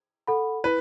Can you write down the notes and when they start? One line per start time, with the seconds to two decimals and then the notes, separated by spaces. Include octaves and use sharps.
0.27 A4 F#5 B5
0.64 E4 B4